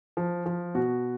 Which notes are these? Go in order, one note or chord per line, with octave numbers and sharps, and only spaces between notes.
F3
F3
B2 F#4